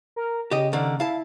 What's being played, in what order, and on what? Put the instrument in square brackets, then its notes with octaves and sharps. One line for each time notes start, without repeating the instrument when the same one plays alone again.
[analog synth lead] A#4
[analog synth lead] C#3 [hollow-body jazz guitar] G4 D#5
[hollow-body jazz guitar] D3 D#3 A#3
[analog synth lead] E4 [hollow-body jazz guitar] F5 A5